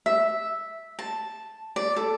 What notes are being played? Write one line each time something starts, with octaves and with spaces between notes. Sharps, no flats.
E5
A5
D5
A4